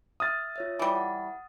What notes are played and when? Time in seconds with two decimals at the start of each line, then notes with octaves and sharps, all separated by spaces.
0.20 E5 D#6 F6 A6
0.56 F4 C#5 E5
0.79 E3 G3
0.95 F#5